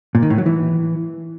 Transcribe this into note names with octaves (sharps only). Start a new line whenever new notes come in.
A#2
D#3
A2
F#3
E3